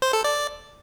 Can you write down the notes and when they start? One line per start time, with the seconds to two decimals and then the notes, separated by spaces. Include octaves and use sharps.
0.02 C5
0.13 A4
0.24 D5